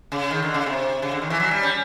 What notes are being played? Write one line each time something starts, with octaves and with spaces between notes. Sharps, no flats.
C#3
D#3
D3
C#3
C3
C#3
D3
D#3
E3
F#3
G3
C#4